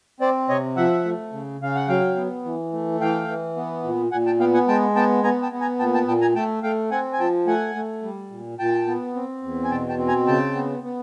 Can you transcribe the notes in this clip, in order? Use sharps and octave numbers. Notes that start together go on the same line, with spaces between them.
C4 C5 D5
C3 C#5 D#5
F3 E5 F#5
A3
C#3
C#3 F5
F#5
F#3 F5 G5
B3
E3
A3
E3 F5 G5
E3
B3
A#2
A#2 F#5 G#5
G5 A5
B3 F5 G5
F#5 G#5
G#3 G5 A5
B3 G5 A5
B3 G#5 A#5
G5 A5
B3
G#5 A#5
A#2 G5 A5
G5 A5
A#2 G5 A5
G#5 A#5
A3 G5 A5
A3 F5 G5
C4 F#5 G#5
G#5
F3 G5 A5
A3 F#5 G#5
A3
G3
A#2
A#2 G5 A5
B3
C4
E2
G#5
B2 G5 A5
G5 A5
C4
G#5 A#5
C#3 G5 A5
B3
B3